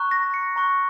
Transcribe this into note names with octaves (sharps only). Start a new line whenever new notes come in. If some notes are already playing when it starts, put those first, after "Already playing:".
Already playing: A#5 C#6 F#6
A#6
C#7
A#5 C#6 F#6